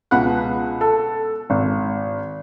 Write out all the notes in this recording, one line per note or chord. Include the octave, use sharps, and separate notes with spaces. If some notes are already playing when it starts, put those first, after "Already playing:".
C#2 B2 F#5 B5 F#6
A4
G#1